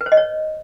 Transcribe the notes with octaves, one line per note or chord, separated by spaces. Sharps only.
B4
C5
D#5
C#5